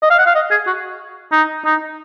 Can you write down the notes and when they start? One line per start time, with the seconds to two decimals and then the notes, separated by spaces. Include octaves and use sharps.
0.02 D#5
0.10 F5
0.18 F#5
0.26 F5
0.35 D#5
0.51 G#4
0.67 F#4
1.32 D#4
1.65 D#4